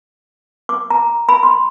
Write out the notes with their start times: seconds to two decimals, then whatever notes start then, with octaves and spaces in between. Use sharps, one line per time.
0.69 D6
0.90 A#5
1.29 B5
1.43 C6